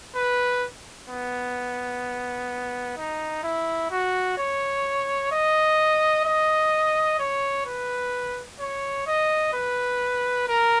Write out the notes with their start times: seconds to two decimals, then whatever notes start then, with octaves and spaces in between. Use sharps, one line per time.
0.15 B4
1.09 B3
2.97 D#4
3.43 E4
3.91 F#4
4.38 C#5
5.32 D#5
6.25 D#5
7.19 C#5
7.66 B4
8.60 C#5
9.07 D#5
9.53 B4
10.48 A#4